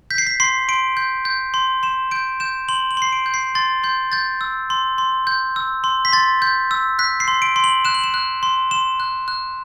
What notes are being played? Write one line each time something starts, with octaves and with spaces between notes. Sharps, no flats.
G6 B6
C7
B6
C6 C7
C6 D7
G6
G6
C6
C6 E7
G6 D7
G6 E7
C6 F#7
F#7
C6 C7
D7
G6
C7
C6 A6
C6 G6
G6 A6
E6
C6
C6
G6
E6
C6
B6
C6 A6
G6
E6
F#6 B6
C7
C6
D7
C6
F#7
F#6 E7
F#7
E7
F#6
C6
C6 E7
F#6
F#6